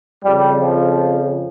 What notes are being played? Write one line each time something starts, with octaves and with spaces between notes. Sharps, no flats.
F2 C#3 G3
F3